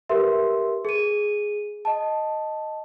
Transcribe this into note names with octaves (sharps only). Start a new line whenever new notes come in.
G4 A#4 B4 E5 C6
G#4 D#7
D#5 A5